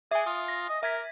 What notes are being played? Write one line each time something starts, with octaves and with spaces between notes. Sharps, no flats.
G#4 E5 G#5
F4 D#6
A#6
D#5
A#4 E5 G#6 B6